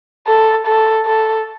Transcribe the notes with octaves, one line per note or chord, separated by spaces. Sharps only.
A4
A4
A4